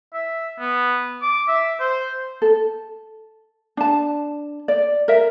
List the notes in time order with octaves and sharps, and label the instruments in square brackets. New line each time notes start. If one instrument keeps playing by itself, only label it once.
[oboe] E5
B3
D6
E5
C5
[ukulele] A4
D4 A5
D5
A#4 E5